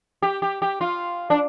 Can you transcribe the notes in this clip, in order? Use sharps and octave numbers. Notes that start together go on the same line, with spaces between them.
G4
G4
G4
F4
D4